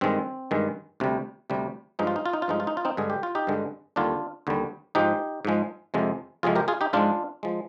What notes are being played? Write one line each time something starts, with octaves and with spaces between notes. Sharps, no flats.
G2 D#3 G#3 C4
G2 D#3 G#3
D2 C3 G3
D2 C3 G3
G2 F3 G#3 D#4
F4
D#4
F4
D#4
F4
G2 F3 G#3 D#4
F4
D#4
F4
C4 D#4
G2 D3 G#3 G#4
G4
F4
D#4 G4
G2 D3 G#3
D#2 D3 G3 D4 F4
D#2 D3 G3
G#2 F3 G#3 D#4 G4
G#2 F3 G#3
F2 C3 F3 G#3
F2 C3 F3 G#3 F4 G#4
G4 A#4
F4 G#4
D#4 G4
G#2 F3 G#3 D4 F4
F3 G#3